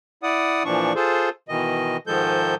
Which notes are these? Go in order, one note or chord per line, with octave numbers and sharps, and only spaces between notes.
E4 D5 F#5 D#6
A#2 E3 F3 D4 C#6
F4 G#4 A4 C5
B2 D#3 E3 D#5
G#2 D#3 F3 G#3 A4 G6